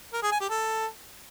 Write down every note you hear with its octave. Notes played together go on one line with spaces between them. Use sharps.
A#4
G#4
G#5
G4
A4